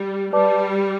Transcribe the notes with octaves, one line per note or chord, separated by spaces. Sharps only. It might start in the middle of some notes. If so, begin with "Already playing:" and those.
Already playing: G3
G3 B4 D5 A5 D6